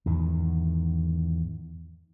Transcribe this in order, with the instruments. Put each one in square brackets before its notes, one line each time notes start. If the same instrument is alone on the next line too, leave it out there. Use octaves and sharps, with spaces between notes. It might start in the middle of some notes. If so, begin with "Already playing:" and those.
[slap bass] E2 G#2 D#3